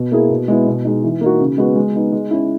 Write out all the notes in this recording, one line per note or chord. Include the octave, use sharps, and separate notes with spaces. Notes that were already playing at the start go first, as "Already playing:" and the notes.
Already playing: B2
A#3 E4 G#4
B2
G#3 B3 E4
B2
G#3 D#4
E3
A#3 D#4 F#4
C#3
G#3 B3 F#4
G#3
B3 D#4
G#3
C#4 E4